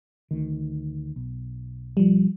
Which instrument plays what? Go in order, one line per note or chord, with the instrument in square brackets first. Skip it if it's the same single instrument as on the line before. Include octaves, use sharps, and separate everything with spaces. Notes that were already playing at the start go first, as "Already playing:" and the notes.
[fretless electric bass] D2 D#3
B1
[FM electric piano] F3 G3